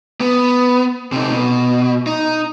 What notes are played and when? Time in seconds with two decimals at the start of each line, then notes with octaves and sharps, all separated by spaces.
0.21 B3
1.12 C3 D#4
1.32 B2
2.07 D#4